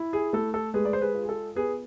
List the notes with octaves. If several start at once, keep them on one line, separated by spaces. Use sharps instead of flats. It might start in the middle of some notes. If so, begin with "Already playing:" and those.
Already playing: E4
G#4
A3 A4
A4
G#3 G#4 B4
D5
C5
G#4 B4
F4
G#4
A4
B3 G#4 B4